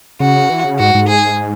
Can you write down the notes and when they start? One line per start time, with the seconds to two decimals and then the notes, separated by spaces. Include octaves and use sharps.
0.20 C#3 F#4
0.50 E3
0.64 C#3
0.79 G#2 F#4
0.95 G#2
1.09 G#4